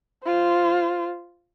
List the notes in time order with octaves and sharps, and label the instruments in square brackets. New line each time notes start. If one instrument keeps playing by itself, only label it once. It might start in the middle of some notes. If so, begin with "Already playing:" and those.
[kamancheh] F4 C5